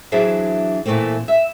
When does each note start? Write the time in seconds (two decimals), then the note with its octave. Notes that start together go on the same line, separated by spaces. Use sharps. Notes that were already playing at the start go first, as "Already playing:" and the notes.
0.12 E3 F#3 D4 G#4 C5 E5
0.86 A#2 E3 A3 A#3 C4
1.28 E5